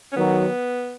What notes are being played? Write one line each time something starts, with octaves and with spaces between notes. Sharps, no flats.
C#4
D#3 F#3 B3